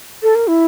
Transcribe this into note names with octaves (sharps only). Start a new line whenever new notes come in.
A4
A#4
E4